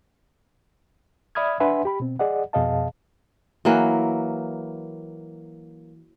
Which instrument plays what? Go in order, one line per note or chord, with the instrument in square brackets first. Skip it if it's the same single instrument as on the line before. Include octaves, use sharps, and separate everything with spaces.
[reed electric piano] D5 E5 B5 D#6 F6 G#6
D4 B4 E5 F#5 G#5 C6
G4 B5
B2 C4
G#4 D5 D#5 F#5
F2 B2 G#4 D#5 F5 A5
[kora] E3 F#3 A#3 B4